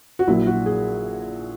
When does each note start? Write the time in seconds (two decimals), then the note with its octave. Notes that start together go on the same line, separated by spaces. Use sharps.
0.19 F#4
0.27 A#1 A#2 F#3 E4
0.47 F#4
0.66 G#4